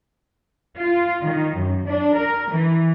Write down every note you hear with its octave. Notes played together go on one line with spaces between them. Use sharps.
F4
D#3
F#2
D4
A#4
E3